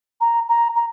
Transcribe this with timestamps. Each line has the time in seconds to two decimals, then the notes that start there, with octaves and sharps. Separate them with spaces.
0.21 A#5
0.49 A#5
0.75 A#5